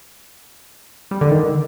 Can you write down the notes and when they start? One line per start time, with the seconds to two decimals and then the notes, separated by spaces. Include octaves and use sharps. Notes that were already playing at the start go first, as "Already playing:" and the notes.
1.11 G3
1.21 D3
1.31 D#3